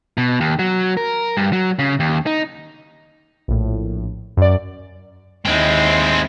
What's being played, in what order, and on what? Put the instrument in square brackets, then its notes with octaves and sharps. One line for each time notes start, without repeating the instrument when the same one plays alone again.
[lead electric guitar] B2
D#2
F#3
A#4
G2
F#3
C#3
D#2
D#4
[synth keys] A#1 A2
F#2 D5
[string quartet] D#2 E4 [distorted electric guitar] G#3 C4